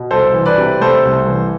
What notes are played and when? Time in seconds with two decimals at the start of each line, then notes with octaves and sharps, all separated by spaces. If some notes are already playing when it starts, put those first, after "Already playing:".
Already playing: B2
0.11 C2 A4 C5
0.34 E3
0.46 B4 D5
0.58 C3
0.81 A3 A4 C5
1.05 C2
1.27 E3